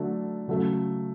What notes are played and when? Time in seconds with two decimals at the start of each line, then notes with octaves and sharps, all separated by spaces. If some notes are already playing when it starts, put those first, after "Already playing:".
Already playing: D3 F#3 A3
0.48 C#3 F#3 A3